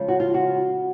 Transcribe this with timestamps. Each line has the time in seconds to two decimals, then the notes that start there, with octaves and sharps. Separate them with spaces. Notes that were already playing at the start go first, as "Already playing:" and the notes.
Already playing: C#3 F3 G#3
0.08 F#4
0.20 F4
0.34 F#4